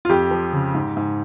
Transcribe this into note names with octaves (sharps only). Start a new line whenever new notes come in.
F4
F2 G4
F3
C#3
G#2
G#2